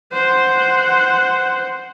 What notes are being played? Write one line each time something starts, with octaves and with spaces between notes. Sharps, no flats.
C5 F#5